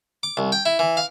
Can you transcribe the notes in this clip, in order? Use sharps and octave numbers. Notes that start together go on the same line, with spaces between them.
D6
C2
G5
E4
E3
F5